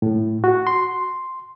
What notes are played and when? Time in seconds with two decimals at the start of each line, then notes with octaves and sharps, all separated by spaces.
0.02 A2
0.44 F#4
0.67 C6